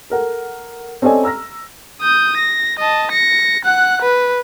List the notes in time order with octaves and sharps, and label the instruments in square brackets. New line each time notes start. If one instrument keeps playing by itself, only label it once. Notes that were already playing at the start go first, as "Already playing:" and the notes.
[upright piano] A4 A#4 F#5
C4 C#4 A4 D5 D#5 G#5
A#5 E6 F6 A#6
[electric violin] D#6 G6
A#6
D#5 A5
A#6 C#7
F#5 F#6
B4